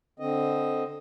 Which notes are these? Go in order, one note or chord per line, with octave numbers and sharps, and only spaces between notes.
D3 C4 D#5